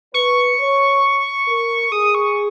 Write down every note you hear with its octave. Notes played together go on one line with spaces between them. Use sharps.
B4 C#6
C#5
A#4
G#4 D#6
C#6